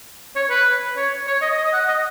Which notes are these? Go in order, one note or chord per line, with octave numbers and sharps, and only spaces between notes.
C#5
B4
C#5
C#5
D#5
D#5
F#5
D#5